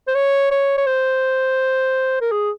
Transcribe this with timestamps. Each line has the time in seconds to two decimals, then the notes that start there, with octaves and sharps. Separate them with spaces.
0.07 C5
0.15 C#5
0.51 C#5
0.78 C#5
0.87 C5
2.21 A#4
2.32 G#4